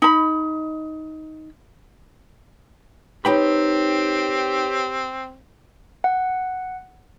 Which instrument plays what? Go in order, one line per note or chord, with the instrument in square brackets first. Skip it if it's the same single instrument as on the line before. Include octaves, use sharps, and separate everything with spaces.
[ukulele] D#4 B5
[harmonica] C4 [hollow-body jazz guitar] D#4 G5 B5 [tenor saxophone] G4 [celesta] B4 C#5
[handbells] F#5